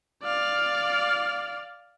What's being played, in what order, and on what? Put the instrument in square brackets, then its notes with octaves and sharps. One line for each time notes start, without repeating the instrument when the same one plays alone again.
[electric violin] D5 F5